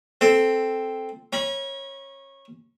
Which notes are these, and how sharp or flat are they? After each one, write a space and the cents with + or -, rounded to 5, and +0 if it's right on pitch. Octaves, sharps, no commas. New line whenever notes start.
C4 +0 A4 -5
C#4 -20 B5 -40